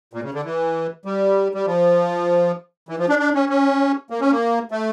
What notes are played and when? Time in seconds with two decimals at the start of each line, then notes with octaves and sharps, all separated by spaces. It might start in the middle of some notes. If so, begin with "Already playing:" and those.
0.13 A#2
0.23 C#3
0.34 D3
0.44 E3
1.05 G3
1.54 G3
1.66 F3
2.89 E3
2.99 F3
3.09 D4
3.19 D4
3.34 C#4
3.49 C#4
4.10 A#3
4.21 C#4
4.31 A#3
4.71 A3